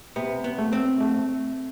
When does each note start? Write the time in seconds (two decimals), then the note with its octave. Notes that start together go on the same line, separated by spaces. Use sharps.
0.16 C3 B3
0.44 B3
0.58 A3
0.73 C4
1.00 A3